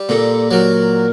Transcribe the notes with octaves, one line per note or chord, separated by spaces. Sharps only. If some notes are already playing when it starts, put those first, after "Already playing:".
Already playing: G3
A#2 A4
F#3 A#4